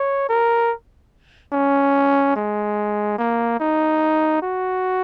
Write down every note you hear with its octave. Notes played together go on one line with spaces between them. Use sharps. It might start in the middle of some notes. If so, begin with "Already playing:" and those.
Already playing: C#5
A#4
C#4
G#3
A#3
D#4
F#4